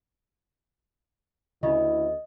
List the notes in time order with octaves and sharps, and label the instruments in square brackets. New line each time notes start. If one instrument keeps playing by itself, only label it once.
[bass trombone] D2 [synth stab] C#3 [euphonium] E4 [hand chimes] D#5